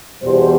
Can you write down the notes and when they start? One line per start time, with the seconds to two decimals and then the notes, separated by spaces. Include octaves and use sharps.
0.22 E2 B2 G3 C5